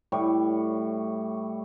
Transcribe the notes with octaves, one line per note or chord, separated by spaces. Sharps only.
A2 G3 C#5